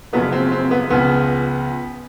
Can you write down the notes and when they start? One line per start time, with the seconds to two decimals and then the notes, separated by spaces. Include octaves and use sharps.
0.13 F#1 F#2 C#3 F3 B3
0.32 C4
0.52 C4
0.71 B3
0.90 C#2 C#3 F3 B3